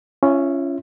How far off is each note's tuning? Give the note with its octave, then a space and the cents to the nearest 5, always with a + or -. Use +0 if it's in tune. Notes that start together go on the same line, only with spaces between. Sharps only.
C#4 +0 F4 -35 E5 +0